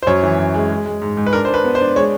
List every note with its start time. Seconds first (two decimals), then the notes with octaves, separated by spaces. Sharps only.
0.03 C5
0.07 F#2 C#5
0.23 E3
0.38 F#2
0.54 G#3
0.70 G#3
0.86 G#3
1.02 G#2
1.17 G#2
1.26 B4
1.33 D4 A#4
1.45 D4 C5
1.54 B4
1.64 B3
1.75 C5
1.81 D4
1.96 G#3 C#5